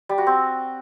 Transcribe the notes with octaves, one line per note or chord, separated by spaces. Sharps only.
G3
F#4
C4